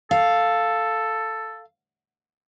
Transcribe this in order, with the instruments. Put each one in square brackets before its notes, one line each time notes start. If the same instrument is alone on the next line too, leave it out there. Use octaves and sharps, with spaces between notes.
[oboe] A4 [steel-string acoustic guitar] F5